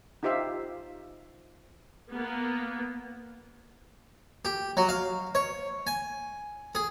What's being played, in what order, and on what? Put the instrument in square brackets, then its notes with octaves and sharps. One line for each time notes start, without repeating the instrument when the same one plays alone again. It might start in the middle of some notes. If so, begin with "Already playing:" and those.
[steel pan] D#4 F4 G4 C5 E5 F5
[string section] A#3 B3
[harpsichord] G4
F#3
F5
C#5
G#5
G#4